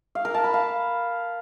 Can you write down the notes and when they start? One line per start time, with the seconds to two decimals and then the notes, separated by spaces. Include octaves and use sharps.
0.15 F5
0.25 A#4
0.34 A5
0.44 B5
0.54 F5